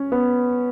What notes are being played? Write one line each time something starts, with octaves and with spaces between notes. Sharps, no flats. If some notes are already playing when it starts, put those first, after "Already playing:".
Already playing: C#4
B3